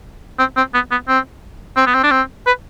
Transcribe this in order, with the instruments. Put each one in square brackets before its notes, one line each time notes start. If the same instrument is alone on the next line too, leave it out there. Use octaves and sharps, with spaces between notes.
[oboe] C4
C4
B3
B3
C4
C4
B3
C4
D4
C4
B4